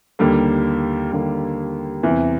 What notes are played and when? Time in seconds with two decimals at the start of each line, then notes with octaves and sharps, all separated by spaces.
0.19 D#2 D3 G3 A#3
1.11 D#2 D3 G3 A#3
2.03 E2 C3 E3